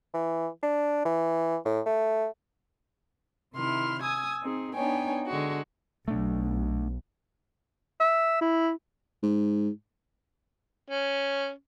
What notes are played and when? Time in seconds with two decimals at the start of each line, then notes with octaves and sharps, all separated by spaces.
0.14 E3
0.63 D4
1.05 E3
1.65 A2
1.86 A3
3.54 C3 D#3 E4 C6 F6
4.02 G#5 D#6 E6 G#6
4.42 C4 D#4 G#4
4.74 B3 D4 D#4 C#5 G5 G#5
5.27 D3 G#3 F#4
6.08 B1 A3 D4
8.00 E5
8.41 E4
9.22 G#2
10.90 C#4